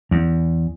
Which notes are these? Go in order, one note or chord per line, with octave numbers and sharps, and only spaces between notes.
E2